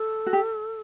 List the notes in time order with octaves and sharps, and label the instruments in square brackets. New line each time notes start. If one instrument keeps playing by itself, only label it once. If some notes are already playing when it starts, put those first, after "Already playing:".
Already playing: [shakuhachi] A4
[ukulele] F#4
G4